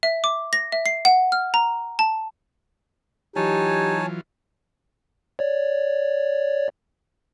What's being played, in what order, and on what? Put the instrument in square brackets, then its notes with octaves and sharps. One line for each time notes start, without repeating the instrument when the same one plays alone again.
[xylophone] E5
D6
A#6
E5
C7
F#5
F6
A#5
A5
[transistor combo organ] E3 F#3 F4 [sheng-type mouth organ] D#4 [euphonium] G4 [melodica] C#5 G#5 A5
[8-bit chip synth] C#5 D5